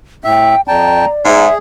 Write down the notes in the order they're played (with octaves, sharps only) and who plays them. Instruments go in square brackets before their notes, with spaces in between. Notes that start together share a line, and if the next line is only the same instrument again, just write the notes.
[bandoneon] A2 E5 [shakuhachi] G5
[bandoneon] F2 G5 A5 [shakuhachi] D5 [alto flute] A#5
[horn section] G#2 [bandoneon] G#4 [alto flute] E5